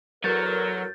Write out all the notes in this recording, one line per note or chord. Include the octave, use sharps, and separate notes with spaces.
E2 F#3 A4 A#4 G6 A6